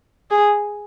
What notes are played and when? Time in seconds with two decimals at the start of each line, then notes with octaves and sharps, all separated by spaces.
0.30 G#4